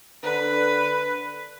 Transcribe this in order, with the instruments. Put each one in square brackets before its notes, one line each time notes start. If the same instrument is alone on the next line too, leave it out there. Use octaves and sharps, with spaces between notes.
[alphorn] D3 [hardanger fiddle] B4